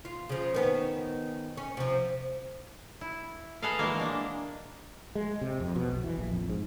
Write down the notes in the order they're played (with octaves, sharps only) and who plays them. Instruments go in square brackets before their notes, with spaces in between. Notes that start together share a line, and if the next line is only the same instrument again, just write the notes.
[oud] F4
C#3 F3
D#3 B3 C#4
C#4
C3 F3
[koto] E4
G#4 A4 B4 D#5 F5
E3 F#3 G#3 A#3
G#3 D4
[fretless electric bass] G#3
C3
F2
B2
B1
E3
A#1
F2
G#2